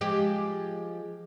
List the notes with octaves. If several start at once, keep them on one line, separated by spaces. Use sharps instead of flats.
F3 G#3 G4